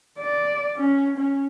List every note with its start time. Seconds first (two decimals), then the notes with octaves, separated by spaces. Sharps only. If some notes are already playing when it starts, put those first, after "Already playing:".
0.18 D5
0.77 C#4
1.18 C#4